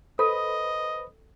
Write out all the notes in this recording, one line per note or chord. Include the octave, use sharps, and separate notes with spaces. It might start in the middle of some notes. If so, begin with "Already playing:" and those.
A4 B4 C5 D#5 B5